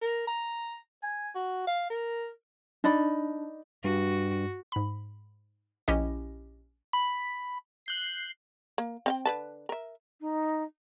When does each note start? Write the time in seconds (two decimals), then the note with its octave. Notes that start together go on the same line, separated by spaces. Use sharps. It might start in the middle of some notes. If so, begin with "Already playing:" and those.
0.01 A#4
0.27 A#5
1.03 G#5
1.35 F#4
1.67 F5
1.90 A#4
2.84 D4 D#4 D5 B5
3.84 G2 F#4
4.72 G#2 B5
5.88 A#1 C#4 E4 G4 D#5
6.93 B5
7.86 F#6 G6 C7
8.78 A#3
9.06 C4 F5 G5
9.25 D3 B4 A5
9.69 A#4 E5
10.20 D#4